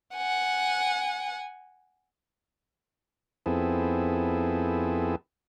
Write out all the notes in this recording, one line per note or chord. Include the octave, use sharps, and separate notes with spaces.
F#5 G#5
F2 B3 C4 E4 G#4 A4